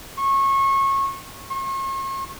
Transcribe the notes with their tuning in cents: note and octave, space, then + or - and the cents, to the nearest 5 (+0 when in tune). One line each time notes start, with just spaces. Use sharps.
C#6 -25
C#6 -45